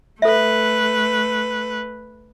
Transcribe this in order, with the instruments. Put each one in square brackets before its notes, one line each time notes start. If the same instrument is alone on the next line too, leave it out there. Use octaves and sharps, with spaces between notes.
[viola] A3 B4 [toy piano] A4 E5